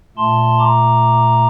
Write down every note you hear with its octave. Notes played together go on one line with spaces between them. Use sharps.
A#2 A3 A5 C6
A#5 D6